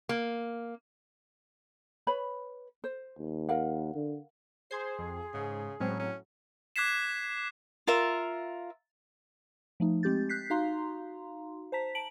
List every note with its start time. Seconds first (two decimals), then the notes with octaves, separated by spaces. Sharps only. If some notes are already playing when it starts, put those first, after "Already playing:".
0.09 A#3
2.07 B4 C#5 B5
2.84 C5
3.19 D#2
3.49 A#4 F5 F#5
3.95 D3
4.71 G#4 C5 C6 G#6 C7
4.99 F2
5.34 G#2 C#3
5.80 A2 F#3 G#3 C4 C#4
6.00 C#4
6.76 D6 F#6 G#6 B6 C7 E7
7.87 F4 A#4 E5
9.80 F3 A3 D#4
10.03 G#3 C4 G4 G6 A6
10.29 F#6 G6 B6 C7
10.50 D#4 F#4 F5 A#5 C6
11.72 C5 A5 A#5 B6
11.95 A5 D7 F#7